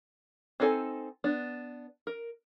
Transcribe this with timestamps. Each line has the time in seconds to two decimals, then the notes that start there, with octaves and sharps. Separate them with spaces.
0.60 C4 D4 D#4 A4 G#5
1.24 B3 D4
2.07 A#4